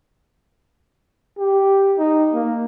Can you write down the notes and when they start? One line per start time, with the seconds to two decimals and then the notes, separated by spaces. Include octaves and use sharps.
1.38 G4
1.98 D#4
2.34 A#3